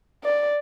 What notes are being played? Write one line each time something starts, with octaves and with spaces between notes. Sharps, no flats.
D5